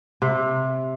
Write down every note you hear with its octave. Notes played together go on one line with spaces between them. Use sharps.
C3